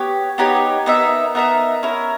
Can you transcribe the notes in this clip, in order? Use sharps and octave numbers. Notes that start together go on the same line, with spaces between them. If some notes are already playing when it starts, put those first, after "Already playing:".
Already playing: B3 G4 C#5
B3 D#4 G4 C#5
B3 D#4 A#4 E5
B3 D#4 A#4 E5
C#4 E4 A#4